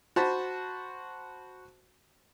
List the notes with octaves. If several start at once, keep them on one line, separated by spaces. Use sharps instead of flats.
F#4 C5 A5 B5